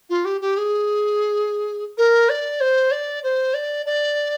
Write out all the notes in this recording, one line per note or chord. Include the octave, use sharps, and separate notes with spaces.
F4
G4
G4
G#4
A#4
D5
C5
D5
C5
D5
D5